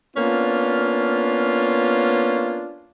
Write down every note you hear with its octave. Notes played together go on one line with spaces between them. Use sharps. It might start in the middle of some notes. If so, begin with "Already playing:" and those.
A#3 B3 C#4 D4 F4